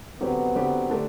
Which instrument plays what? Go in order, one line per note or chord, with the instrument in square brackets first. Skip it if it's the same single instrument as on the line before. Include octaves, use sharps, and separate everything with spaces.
[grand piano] D3 F#3 C4 G4 B4 [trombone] B3
[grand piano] D3 F#3 C4 G4 B4
D3 A3 D4 G4